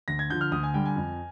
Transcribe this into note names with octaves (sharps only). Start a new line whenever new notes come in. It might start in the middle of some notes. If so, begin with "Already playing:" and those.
D2 A#6
G#6
D3 F3 G6
F6
D2 D#6
G#5
D3 G3 G5
G#5
F2